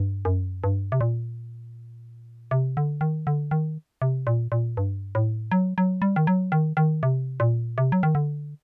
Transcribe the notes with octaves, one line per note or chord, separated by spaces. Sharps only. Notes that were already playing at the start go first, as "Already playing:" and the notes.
Already playing: G2
F#2
G2
C3
A#2
C3
D3
D#3
D3
D#3
C3
A#2
A#2
G2
A2
F#3
F#3
G3
D#3
F#3
D#3
D#3
C3
A#2
C3
F#3
D#3
D3